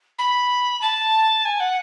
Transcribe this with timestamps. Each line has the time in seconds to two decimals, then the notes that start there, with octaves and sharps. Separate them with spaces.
0.18 B5
0.81 A5
1.45 G#5
1.60 F#5